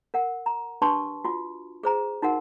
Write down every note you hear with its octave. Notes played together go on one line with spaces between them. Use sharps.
A#4 F#5
A#5
D4 G4 B4 A5 C6 C#6
F4 F#4
G#4 C5 A#5
D#4 F#4 A#4 F#5